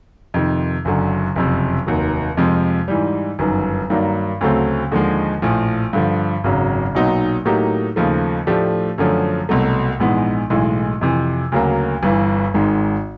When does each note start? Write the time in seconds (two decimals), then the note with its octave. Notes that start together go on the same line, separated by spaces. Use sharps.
0.34 F2 C3 D#3
0.85 F#1 F#2 D3
1.36 F#1 F2 C3
1.87 F1 D#2 D#3 F#3
2.37 F2 C3 F3 G#3
2.88 G#2 E3 G3
3.39 G1 F#2 D#3
3.90 G2 D#3 F#3 A#3 D4
4.41 D2 C#3 F#3 A3 C4
4.92 D#2 D3 F3 G#3
5.42 A#1 A2 F3
5.93 G2 D3 F3
6.44 G#1 F#2 C#3 F#3
6.95 B1 A#2 F#3 B3 D#4
7.45 A2 F#3 A#3 D#4 G4
7.96 D#2 C#3 F3 A3
8.47 A2 F3 A3 D4 G4
8.98 F#2 D3 F3 A3 C#4
9.49 C2 B2 F#3 A3
10.00 A#1 G#2 E3 G#3 B3
10.50 B1 A2 E3 G#3
11.01 F2 C3 E3
11.52 D2 C#3 F#3 A#3
12.03 G1 G2 E3
12.54 G#1 G#2 D#3 G#3